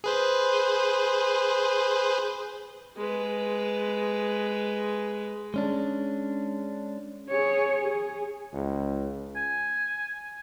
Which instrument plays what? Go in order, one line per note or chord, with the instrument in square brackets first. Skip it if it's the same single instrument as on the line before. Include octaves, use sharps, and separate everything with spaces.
[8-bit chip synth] G#4 B4 C5
[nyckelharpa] G#3 B4
[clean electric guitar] G#3 C#4 D4
[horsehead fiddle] G#4 C#5
G#4
[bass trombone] C#2
[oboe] G#5